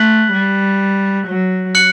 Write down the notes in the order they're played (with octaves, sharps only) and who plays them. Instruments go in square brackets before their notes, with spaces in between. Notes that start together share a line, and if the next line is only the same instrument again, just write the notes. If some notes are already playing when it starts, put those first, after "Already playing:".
Already playing: [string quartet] A3 [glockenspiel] F#6 B6 F#7
[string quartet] G3
F#3
[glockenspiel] F#6 C#7 F#7